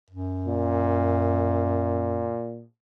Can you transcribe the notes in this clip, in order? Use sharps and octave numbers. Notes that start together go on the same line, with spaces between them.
F#2
A#2